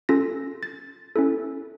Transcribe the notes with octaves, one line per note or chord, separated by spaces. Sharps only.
C#4 F4 A4 A#6
A6
C#4 E4 A4